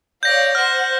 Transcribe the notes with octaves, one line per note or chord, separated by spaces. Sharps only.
C#5 D5 F5 G6 A#6
C5 F#5 F6 A#6